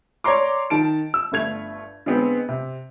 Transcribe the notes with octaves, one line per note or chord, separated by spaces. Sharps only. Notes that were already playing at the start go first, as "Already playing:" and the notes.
C#5 D5 A#5 C6 D6
D#3 A5 D7
E6
G1 G2 A3 G#6 F7
D3 G#3 B3 C4
C3